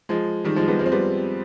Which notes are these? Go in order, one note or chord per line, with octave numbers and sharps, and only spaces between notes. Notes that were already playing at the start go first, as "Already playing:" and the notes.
F3 G#3
D#3 G3
F3 G#3
G3 B3
F3 G#3
C4
G3 B3